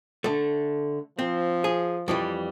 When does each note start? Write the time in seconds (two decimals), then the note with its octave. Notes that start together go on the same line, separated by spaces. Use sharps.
0.24 D3 A3
1.19 F3 C4
1.64 G#4
2.08 F2 E3 G3